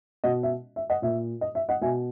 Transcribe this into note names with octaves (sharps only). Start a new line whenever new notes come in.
B2 D#5 F#5
E5
E5
D#5 F#5
A#2 E5
D#5
E5
D#5 F#5
B2 E5 G#5